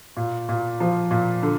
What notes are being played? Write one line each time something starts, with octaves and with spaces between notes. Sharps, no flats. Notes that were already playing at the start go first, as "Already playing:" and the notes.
A#2
A#2
F3
A#2
D3